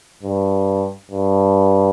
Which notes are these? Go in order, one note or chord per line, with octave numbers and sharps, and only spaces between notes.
G2
G2